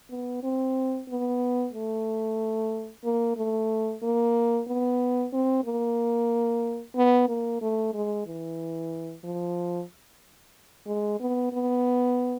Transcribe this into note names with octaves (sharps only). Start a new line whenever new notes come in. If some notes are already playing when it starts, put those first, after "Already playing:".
B3
C4
B3
A3
A#3
A3
A#3
B3
C4
A#3
B3
A#3
A3
G#3
E3
F3
G#3
B3
B3